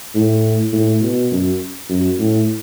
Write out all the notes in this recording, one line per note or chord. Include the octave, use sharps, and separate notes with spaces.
A2
A2
B2
F#2
F#2
A2